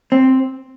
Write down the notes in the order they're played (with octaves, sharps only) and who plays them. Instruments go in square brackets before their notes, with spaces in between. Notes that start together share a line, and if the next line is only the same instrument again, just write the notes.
[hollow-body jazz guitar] C4